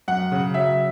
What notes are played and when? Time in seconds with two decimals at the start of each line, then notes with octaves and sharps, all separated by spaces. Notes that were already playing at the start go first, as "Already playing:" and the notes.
0.08 F#2 F#5
0.32 C#3
0.54 F#3 E5